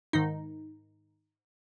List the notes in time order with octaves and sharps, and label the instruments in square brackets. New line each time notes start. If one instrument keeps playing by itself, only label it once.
[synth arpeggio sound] G#2 D#3 D#4